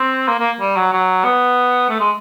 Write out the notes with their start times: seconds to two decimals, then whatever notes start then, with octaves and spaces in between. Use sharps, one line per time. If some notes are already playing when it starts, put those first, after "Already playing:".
Already playing: C4
0.28 A#3
0.39 A#3
0.60 G3
0.76 F#3
0.93 F#3
1.24 B3
1.89 A3
1.99 G#3